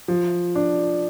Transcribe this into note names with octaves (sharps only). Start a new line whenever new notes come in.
F3
D4